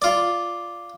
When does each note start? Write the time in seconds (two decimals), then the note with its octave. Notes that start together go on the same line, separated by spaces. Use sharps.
0.02 F4 D5